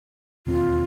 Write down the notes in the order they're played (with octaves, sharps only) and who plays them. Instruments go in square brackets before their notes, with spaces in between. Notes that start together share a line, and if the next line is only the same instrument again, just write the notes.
[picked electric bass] E1 D#2 C4 [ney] F4